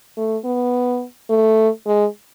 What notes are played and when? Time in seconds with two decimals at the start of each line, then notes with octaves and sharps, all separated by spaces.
0.17 A3
0.45 B3
1.30 A3
1.86 G#3